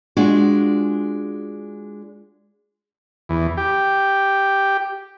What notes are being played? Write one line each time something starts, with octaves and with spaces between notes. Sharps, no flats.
G#3 D4 F4 F#4
E2
G4